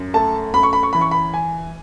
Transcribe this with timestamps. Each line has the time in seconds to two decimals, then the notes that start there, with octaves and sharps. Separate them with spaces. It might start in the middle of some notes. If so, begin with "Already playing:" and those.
Already playing: F#2
0.14 A3 A5
0.54 F#2 B5
0.63 C#6
0.73 B5
0.83 C#6
0.93 E3 B5
1.01 C#6
1.11 B5
1.34 G#5